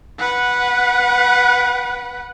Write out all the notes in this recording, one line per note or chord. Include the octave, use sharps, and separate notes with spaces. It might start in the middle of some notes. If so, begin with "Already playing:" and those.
B4 F#5